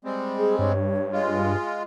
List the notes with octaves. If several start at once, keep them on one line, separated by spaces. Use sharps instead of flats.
G3 G#3 C4
G#4
G2 C#5
G#3 F4